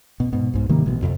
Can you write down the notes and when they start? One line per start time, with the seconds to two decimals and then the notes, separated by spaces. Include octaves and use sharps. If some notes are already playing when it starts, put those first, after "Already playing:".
0.20 B2
0.33 G#2 B2
0.54 B1 G#2
0.69 C3 D#3 G3 A#3
0.86 A1 B2
1.02 F2 C3